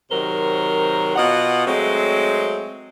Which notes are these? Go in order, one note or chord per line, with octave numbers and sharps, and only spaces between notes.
C3 D#3 F#3 A#4 C5
B2 F4 D#5 F#5
F#3 G#3 A3 C4